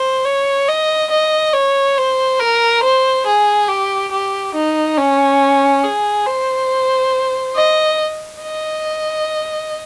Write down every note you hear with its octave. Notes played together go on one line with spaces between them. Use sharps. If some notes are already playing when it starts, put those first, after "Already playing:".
Already playing: C5
C#5
D#5
D#5
C#5
C5
A#4
C5
G#4
G4
G4
D#4
C#4
G#4
C5
D#5
D#5